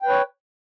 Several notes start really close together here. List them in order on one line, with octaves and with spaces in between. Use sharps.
G5 B4 C#5